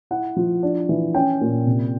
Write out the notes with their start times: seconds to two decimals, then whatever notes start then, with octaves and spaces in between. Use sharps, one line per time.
0.11 E4 F#5
0.36 F3
0.63 D4
0.89 E3
1.15 C#4 G5
1.41 A#2
1.67 C3